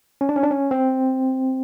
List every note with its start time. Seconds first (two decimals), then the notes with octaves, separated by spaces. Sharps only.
0.21 C#4
0.29 D4
0.36 C#4
0.43 D4
0.51 C#4
0.71 C4